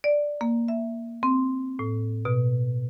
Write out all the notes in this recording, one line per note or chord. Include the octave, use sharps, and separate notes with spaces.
D5
A#3
E5
C4
A2
B2